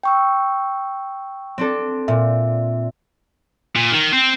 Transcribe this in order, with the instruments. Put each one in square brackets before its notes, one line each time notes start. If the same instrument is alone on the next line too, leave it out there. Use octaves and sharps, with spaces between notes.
[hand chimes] G5 C#6 E6
[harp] C4 D4 A4
[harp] A#2 [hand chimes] E5
[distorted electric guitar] A#2
D#3
C4